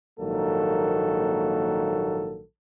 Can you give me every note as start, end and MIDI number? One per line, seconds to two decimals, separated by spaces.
0.20 2.42 34
0.20 2.42 44
0.20 2.42 51
0.20 2.42 54
0.20 2.42 58
0.20 2.42 69